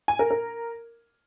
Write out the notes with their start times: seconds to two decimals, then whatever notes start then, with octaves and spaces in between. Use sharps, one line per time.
0.08 G#5
0.19 A#4
0.31 A#4